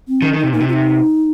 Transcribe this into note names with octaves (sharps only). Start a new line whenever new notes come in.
C4
D#3 C#4
D#3
C3 D#4
A#2 D#4
C3
F4
D#4